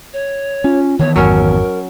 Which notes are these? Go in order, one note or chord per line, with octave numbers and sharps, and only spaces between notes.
C#5
C#4 F4
D#3 E3 B3 C#5
A1 F2 G#2 F#3 C#4 A#4